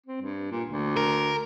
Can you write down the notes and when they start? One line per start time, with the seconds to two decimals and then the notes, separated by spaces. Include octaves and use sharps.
0.06 C4
0.22 G2
0.52 A#2
0.70 D2
0.97 A#4